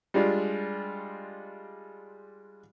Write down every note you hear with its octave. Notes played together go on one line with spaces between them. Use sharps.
G3 G#3 D4 F4